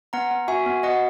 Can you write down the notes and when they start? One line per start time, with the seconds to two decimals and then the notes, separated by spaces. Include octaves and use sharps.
0.13 B3 F#5 A#5
0.31 B3
0.48 F#4 E5 G#5
0.66 B3
0.83 F#4 D#5 F#5